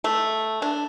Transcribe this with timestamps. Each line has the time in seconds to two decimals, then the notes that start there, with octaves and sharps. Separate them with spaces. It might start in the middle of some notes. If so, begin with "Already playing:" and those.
0.04 A3
0.62 D4